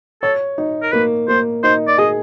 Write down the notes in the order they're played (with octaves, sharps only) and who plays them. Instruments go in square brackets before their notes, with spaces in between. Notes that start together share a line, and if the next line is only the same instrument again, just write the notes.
[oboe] A4 [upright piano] C#5
[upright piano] D#4
[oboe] A#4
[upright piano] A#3 [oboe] B4
[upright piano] A#3 [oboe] C5
[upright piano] D#4 [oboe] C5
[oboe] D5
[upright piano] G#4 [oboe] D#5